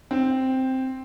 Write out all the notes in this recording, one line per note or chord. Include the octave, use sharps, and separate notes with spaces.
C4